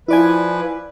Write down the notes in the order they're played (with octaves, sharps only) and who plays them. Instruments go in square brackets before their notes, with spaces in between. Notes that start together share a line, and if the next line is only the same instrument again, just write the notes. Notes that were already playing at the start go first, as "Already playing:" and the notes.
[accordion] F3 B4 [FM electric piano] E4 D5 G#5